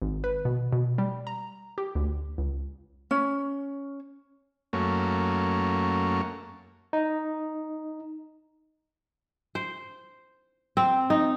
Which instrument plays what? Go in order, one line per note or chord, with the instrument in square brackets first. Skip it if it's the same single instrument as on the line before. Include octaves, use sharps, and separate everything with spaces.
[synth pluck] G#1
B4
B2
B2
G3
A#5
G4
D2
C#2
[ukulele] C#4
[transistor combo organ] F#2 A3 A#3 C#4
[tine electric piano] D#4
[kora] C5
C4
D#4